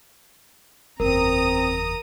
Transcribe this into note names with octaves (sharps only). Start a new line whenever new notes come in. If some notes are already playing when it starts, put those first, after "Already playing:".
F#1 E2 C4 A#4 A#5 D#6